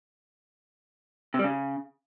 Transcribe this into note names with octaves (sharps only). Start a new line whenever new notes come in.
C3
G3
C#3